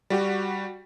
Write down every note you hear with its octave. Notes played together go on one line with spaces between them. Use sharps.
G3 F#4 G4